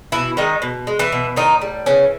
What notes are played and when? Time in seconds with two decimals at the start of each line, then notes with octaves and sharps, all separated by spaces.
0.12 B2 E3 E4
0.37 D#3 G#3 D#4
0.62 B2
0.87 G#3
0.99 E3 E4
1.12 B2
1.36 A2 D#3 D#4
1.62 G3
1.86 C#3 E3 C#4